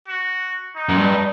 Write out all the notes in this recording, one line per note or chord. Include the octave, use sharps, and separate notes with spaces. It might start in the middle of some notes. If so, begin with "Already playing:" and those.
F#4
D#4
F#2
G2